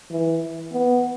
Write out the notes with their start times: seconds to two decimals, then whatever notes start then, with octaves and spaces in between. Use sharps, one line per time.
0.10 E3
0.72 B3